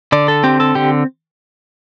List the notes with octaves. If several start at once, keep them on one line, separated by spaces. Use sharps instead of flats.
D3 D5
A4
C4 G4
A4
D3 G4